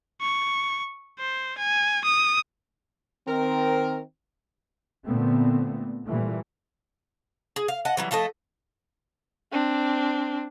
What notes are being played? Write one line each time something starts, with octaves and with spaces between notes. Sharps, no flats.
C#6
C5
G#5
D#6
D#3 C4 A#4
A#2 D3 A3 B3 C4
A#2 E3 G3 A3
G#4
F5
D#5 F#5 A5
E3 F#3 G3
F3 A3 A4 D#5
C4 D4